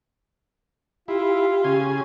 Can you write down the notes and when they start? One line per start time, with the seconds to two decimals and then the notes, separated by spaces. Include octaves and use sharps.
1.08 E4 F4 G4
1.64 C#3 G#5